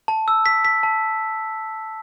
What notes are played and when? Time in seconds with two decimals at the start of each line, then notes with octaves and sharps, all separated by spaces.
0.08 A5
0.28 E6
0.46 B6
0.65 B6
0.83 A5